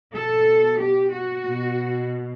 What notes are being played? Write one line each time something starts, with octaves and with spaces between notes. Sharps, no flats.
B2 A4
G4
F#4
B2